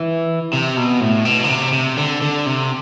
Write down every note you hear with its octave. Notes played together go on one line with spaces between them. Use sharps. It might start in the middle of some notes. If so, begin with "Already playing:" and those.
Already playing: E3
C3
B2
A2
B2
D3
C3
C3
D3
D3
C3